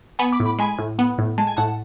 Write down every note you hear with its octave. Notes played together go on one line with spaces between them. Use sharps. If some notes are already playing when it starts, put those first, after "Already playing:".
B3 G#5 B5
B5 D6
A2
B5 D6
G#3 G#5 B5
A2
B3
A2
G#3 A5
G#5
A2 F#5 A5